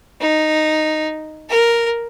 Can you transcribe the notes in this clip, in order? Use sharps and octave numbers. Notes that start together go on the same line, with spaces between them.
D#4
A#4